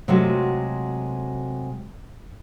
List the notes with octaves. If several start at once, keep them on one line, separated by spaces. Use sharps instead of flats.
C3 F#3 G#3 A3 F4 F#4